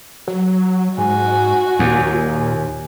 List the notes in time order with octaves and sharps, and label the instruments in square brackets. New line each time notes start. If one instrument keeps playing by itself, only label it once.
[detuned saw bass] F#3
[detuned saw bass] G#2 [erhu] F#4 [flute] G#5
[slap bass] D#2 [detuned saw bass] A#2